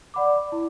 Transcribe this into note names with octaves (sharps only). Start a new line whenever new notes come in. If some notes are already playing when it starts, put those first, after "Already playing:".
D5 F#5 B5 D6
E4